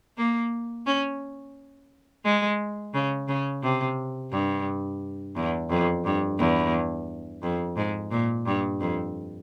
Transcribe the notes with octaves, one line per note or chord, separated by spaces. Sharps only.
A#3
C#4
G#3
C#3
C#3
C3
G2
E2
F2
G2
E2
F2
G#2
A#2
G2
F2